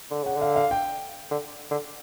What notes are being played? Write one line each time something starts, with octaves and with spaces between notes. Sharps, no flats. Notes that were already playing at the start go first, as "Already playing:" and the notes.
D3
C#3 F#5
D3
F5
F5
G5
D3
D3